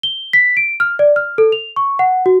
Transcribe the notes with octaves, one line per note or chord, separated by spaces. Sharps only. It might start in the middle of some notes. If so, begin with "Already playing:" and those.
G7
B6
D7
F6
D5
F6
A4
F7
C#6
F#5
F#4